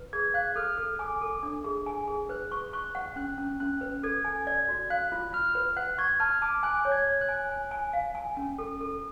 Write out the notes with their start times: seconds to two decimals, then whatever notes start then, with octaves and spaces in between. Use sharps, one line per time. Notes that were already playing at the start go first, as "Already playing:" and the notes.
Already playing: B4
0.13 G#4 G#6
0.34 F5 F#6
0.56 A4 F6
0.78 A4
0.99 G#5 D6
1.22 A4
1.43 D4
1.64 G#4
1.86 G#5
2.08 G#4
2.29 B4 F#6
2.52 C#6
2.73 C#6 F#6
2.95 F#5
3.16 C#4 F#6
3.38 C#4
3.60 C#4 F#6
3.81 B4
4.03 A4 G#6
4.25 G#5
4.47 D5 G#6
4.68 F#4
4.90 F5 F#6
5.12 F4
5.33 F4 F6
5.55 B4
5.77 F#5 F#6
5.98 C#6 G#6
6.20 A5 F6
6.42 A5 D6
6.63 G#5 F#6
6.85 C#5
6.92 G#6
7.06 C#5
7.21 F#6
7.29 G#5
7.49 G#5
7.71 G#5
7.93 F5
8.15 G#5
8.37 C#4
8.59 A4
8.80 A4